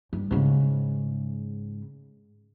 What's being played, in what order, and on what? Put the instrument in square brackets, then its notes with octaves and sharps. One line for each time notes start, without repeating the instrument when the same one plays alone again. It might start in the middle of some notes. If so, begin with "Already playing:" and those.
[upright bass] G2
G#2 C#3